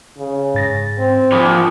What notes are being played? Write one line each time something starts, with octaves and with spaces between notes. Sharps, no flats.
C#3
G#2 A6 A#6
C4
F3 B5 D6 D#6